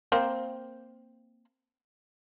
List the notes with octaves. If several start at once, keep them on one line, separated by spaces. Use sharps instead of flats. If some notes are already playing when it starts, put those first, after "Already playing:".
A#3 C4 C5